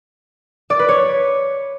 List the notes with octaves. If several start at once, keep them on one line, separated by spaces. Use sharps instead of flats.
D5
B4
C#5